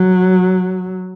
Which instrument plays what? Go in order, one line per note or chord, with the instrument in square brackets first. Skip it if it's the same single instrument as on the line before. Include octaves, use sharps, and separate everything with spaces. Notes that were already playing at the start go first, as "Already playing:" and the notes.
Already playing: [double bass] F#3